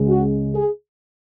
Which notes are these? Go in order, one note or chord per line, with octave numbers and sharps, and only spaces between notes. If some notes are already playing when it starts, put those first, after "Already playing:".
Already playing: C#2 C#3 G#3
F#4
G#4